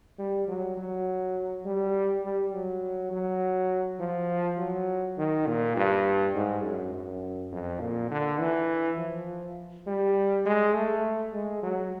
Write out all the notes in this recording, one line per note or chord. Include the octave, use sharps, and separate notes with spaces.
G3
F#3
F#3
G3
G3
F#3
F#3
F3
F#3
D#3
A#2
G2
G#2
F#2
F#2
F2
A#2
D3
E3
F3
G3
G#3
A3
G#3
F#3